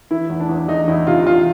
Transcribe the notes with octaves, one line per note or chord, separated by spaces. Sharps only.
E3 E4
E2
D4
E2
E2 D#4
E2 E4
C3 F4
E2 F4